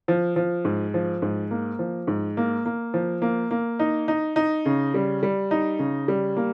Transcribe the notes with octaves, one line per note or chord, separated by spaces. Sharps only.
F3
F3
G#2
F3
G#2
A#3
F3
G#2
A#3
A#3
F3
A#3
A#3
D#4
D#4
D#4
C#3
G3
G3
D#4
C#3
G3
A#3